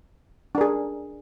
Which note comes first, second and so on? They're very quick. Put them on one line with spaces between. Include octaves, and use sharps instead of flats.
D4 A#4 G#4